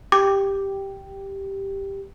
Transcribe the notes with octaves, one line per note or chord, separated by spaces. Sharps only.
G4 D6